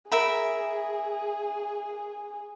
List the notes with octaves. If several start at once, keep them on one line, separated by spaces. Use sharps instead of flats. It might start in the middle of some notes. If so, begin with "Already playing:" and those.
G#4 A#4 E5 B5